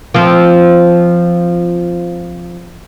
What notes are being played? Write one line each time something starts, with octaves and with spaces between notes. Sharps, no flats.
F3 C4